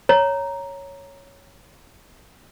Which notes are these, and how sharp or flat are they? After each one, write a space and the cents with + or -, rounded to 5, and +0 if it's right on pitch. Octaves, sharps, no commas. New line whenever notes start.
C#5 +0 A#5 +0